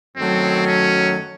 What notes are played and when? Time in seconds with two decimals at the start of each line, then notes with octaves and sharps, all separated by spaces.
0.17 F#2 D#3 F#3 A3 C4
0.67 C#4